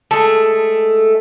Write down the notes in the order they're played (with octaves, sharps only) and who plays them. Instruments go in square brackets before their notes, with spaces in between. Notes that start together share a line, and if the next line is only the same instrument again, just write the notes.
[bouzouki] G#3 A3